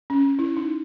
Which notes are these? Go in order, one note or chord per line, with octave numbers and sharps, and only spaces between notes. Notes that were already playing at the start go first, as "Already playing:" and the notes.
C#4
E4
D#4